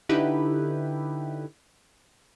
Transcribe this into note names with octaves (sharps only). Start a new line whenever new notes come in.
D3 D#4 E4 G4 B4